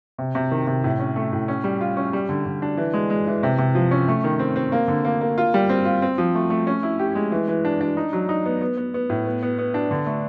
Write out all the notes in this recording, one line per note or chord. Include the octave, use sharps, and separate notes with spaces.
C3
C3
D#3
C3
A2
C#4
A3
A2
C#4
G3
F4
C#4
G3
D3
D3
D4
E3
G#3
G#3
E3
C3
C3
F3
C#4
A3
D#3
C4
C4
A#3
D3
A#3
A#3
F4
G3
C4
F4
C4
F3
A3
A3
C#4
E4
G4
G#3
E3
E3
D4
D4
D#4
F#3
D#4
B3
B3
B3
B3
A2
B3
B3
B3
D4
D3
A3